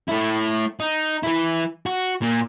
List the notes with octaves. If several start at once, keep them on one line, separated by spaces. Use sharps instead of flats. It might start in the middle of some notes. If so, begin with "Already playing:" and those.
A3 E4
D#4
E3 E4
F#4
A#2